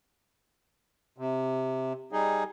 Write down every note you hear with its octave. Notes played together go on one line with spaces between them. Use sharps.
C3
G3 D#4 G#4